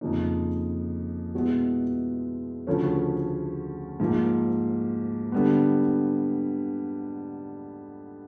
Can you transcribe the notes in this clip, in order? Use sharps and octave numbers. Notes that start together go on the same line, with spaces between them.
F2 C#3 F3 A#3 D#4
B2 G#3 B3 E4
D2 C#3 F3 A3 C#4
G#2 F3 A#3
D3 G3 B3